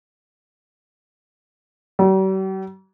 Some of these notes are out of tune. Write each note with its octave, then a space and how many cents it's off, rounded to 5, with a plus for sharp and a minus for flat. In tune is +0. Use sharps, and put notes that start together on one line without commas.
G3 -45